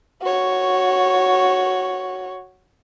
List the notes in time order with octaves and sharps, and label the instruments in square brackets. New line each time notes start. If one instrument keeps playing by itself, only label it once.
[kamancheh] F#4 C#5